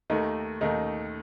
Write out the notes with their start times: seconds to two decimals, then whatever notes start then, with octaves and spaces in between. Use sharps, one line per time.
0.10 D#2 D#3 A3 D#4
0.61 D#2 D#3 A3 D#4